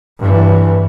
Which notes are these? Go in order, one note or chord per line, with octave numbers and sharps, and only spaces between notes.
G2 E3